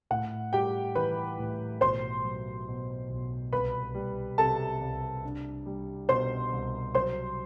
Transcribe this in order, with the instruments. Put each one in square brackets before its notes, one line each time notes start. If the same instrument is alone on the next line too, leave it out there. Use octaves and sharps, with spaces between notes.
[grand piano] A2 [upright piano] F#5
[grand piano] G3 [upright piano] G4 G5
[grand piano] E3 [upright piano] B4 B5
[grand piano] A2
[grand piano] B1 [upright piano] C5 C6
[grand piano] F#3
B2
B1
[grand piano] C2 [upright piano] B4 B5
[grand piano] G3
[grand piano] C3 [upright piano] A4 A5
[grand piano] C2
D4
G3
[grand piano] B2 [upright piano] C5 C6
[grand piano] C2
[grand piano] F#3 [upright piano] C5 C6